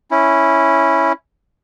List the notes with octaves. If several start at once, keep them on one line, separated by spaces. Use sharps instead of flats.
C#4 E4